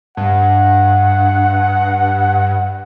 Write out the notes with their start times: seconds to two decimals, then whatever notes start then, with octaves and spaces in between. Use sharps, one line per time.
0.17 G2 F#5